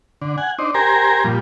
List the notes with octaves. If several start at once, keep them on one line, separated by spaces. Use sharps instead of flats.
D3
F#5 G#5
D4 D#4 C5
G4 A#4 C5 G#5 A#5
A#2 F3 G3